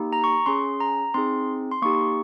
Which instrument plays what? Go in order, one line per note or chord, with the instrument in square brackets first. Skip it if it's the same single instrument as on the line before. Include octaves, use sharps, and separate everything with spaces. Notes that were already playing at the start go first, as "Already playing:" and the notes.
Already playing: [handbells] A#3 D#4 G4
A#5
C#6
C#4 G#4 C6
A#5
C4 D#4 G#4 C6
C6
A#3 D#4 G4 C#6